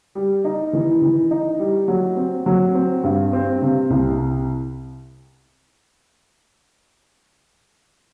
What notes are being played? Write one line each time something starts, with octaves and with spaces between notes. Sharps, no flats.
G3
D#4
E3
E3
D#4
G3
F#3
C4
F#3
C4
G2
C4
C3
C2